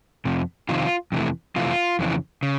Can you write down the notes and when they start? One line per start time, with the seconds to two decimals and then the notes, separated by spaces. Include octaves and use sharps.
0.25 F2 C3
0.69 F2 C3 D#3 F4
1.12 F2 C3 E3 A3
1.56 F2 C3 E3 A3 F4
1.99 F2 C#3 E3
2.43 C#3